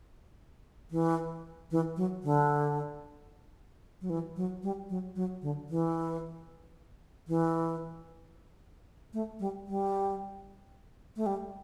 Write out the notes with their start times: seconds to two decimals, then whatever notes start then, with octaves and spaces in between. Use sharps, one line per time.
0.91 E3
1.71 E3
1.97 F#3
2.23 D3
4.01 F#3
4.10 E3
4.36 F#3
4.63 G3
4.89 F#3
5.15 F#3
5.42 D3
5.69 E3
7.28 E3
9.13 A3
9.39 G3
9.67 G3
11.16 A3
11.26 G3